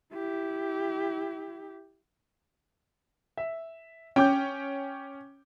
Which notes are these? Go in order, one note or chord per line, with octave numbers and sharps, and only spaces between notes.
E4 G4
E5
C#4 G5 D6 G6